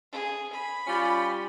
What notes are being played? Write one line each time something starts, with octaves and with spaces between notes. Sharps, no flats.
G#4
B5
G3 C#4 F4